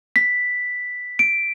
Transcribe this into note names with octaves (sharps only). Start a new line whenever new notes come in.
B6
D7